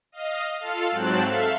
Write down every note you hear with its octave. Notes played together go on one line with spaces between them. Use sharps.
D#5 F5
F4 A4 F5
G#2 F#3 C4 A5 F#6
A4 E5 F5